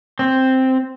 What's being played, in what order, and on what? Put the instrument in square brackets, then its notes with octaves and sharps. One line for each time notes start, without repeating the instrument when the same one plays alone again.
[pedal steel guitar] C4